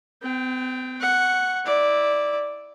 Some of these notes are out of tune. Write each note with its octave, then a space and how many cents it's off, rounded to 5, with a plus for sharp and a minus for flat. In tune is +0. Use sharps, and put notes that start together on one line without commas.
C4 -45 G5 +0
F#5 +0 C#6 -10
E4 -10 D5 +0